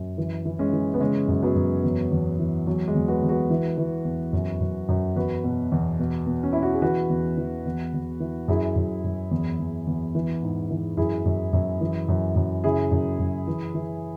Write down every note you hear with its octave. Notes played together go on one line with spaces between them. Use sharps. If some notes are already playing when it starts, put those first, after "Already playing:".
Already playing: F#2
E3
E3
G#3 C#4
E3
B3
C#3 G#3 C#4
F#2
F#3 B3
F#2
E2
E2
E3
E2 F#3
G#3
E2
F#4 B4
E2
F#4 B4
E3
E3
E2
F#2
F#2
F#2
E2 F#4 B4
B2
E2
B2
B2
C#4
B2 E4
F#4
G#4
E3 F#4 B4
E2
E3
E2
E2
E3
F#2 E4 G#4
F#2
F#2
E2
E2
E2
E3
G#2
E3
F#2 E4 G#4
F#2
F#2
E3
F#2
F#2
C#3 E4 G#4
F#2
F#2
E3
E3